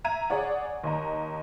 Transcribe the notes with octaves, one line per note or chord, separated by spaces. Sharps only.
E5 A#5 G#6 D#7
G#4 C#5 D5 F#5
D#2 D#5 A#5